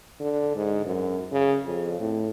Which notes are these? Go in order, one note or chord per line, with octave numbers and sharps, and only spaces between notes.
D3
G#2
F#2
C#3
F2
A2